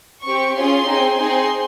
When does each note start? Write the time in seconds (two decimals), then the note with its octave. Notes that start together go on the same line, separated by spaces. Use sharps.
0.25 C4 G4 C#6
0.56 C#4 F4 G#4 C6
0.86 C4 D#4 G#4
1.17 C4 D#4 G#4 C6